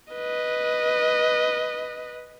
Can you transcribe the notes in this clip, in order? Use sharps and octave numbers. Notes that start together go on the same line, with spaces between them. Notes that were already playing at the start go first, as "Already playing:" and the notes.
B4 D#5